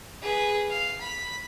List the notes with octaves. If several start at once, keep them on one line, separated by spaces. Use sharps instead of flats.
G#4 B4
F5
B5